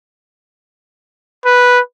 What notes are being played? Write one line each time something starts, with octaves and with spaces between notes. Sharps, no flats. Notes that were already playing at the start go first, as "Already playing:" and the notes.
B4